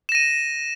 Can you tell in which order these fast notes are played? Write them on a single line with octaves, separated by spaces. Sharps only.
E7 A#6 D#7